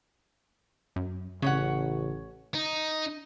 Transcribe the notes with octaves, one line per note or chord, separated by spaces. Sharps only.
F#2
A1 C#3 C#4 C#5 F#5
D#4